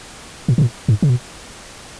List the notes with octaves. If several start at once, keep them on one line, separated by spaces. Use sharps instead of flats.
A#2
B2
A#2
G#2
C#3
B2